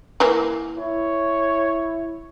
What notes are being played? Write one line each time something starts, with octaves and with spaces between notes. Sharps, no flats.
E3 A#3
E4 C#5